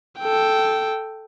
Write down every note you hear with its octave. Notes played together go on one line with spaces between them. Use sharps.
A4 G5